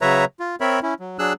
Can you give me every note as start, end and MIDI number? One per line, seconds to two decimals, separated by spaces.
0.01 0.25 49
0.01 0.25 54
0.01 0.25 71
0.01 0.25 73
0.01 0.25 76
0.01 0.25 82
0.40 0.56 65
0.61 0.80 60
0.61 0.80 70
0.61 0.80 73
0.61 0.80 76
0.61 0.80 83
0.83 0.94 61
0.83 0.94 64
1.00 1.19 54
1.19 1.33 54
1.19 1.33 62
1.19 1.33 68
1.19 1.33 88
1.19 1.33 90